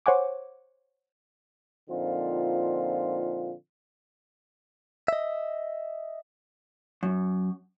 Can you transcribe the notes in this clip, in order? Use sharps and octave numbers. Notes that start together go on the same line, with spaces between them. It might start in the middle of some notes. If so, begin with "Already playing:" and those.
C5 C#5 F#5 G#5 D6
A#2 D3 F3 C4 D#4 F4
D#5 E5
F#2